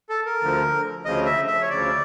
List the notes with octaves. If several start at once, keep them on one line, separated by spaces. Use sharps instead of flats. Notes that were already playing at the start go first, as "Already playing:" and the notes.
A4
A#4
D2 D3 F3
D2 C#3 F3 D#5
E5
E5
C#5
D2 C#3 F3 D5